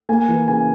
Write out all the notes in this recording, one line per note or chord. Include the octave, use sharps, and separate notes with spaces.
A#3 G#5
E3
C#3 G#5